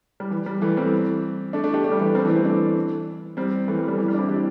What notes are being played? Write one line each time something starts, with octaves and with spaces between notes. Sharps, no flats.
G3
E3
G3
E3 A3
G3 C4
A3 D4
A3 D4
D4 G4
A3 D4
G3
E3 A3
G3 C4
E3 A3
G3 C4
A3 D4
G3 C4
E3 A3
G3
G3
E3
G3
D4
C4 E4
D4 G4